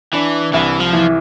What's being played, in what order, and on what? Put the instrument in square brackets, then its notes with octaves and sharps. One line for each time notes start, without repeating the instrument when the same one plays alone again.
[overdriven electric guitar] E3 [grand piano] D4
[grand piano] C2 [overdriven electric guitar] E3
[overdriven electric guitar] F3
[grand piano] E3